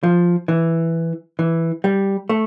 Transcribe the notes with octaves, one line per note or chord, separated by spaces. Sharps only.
F3
E3
E3
G3
A3